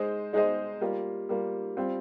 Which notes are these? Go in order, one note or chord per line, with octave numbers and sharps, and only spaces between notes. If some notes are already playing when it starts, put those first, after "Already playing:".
Already playing: G#3 D#4 G#4 C5 D#5
G#3 D#4 G#4 C5 D#5
G3 A#3 F4
G3 A#3 F4
G3 C4 F4 C5